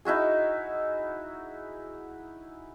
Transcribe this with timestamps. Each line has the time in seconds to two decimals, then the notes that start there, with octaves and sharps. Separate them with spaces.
0.05 D#4 E4 F#4 G#4